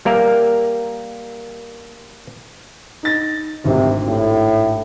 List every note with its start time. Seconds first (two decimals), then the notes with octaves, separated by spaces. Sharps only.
0.05 G3 A#3 A#4 E5
3.03 D#4 A6 A#6
3.65 G#1 D2 C3
4.08 A2